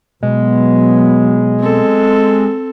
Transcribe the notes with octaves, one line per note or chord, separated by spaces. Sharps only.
B2 F#3 G#3 B3
C4 A4